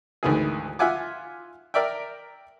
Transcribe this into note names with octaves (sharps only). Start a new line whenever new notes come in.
D2 G#2 D#3 E3 E4 G#4
F4 E5 F#5 G#5 D6
A#4 D5 E5 G5